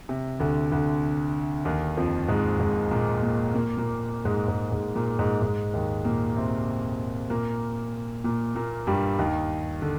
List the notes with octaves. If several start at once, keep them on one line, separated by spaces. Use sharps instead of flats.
C3
D2 D3
D2 D3
D#2 D#3
F2 F3
G#2 G#3
G#2 G#3
A#2 A#3
A#2 A#3
A#2 A#3
A#2 A#3
G#2 G#3
G#2 G#3
G#2 G#3
A#2 A#3
G#2 G#3
G#2 G#3
D#2 D#3
A#2 A#3
C3 C4
A#2 A#3
A#2 A#3
A#2 A#3
G2 G3
D#2 D#3
D3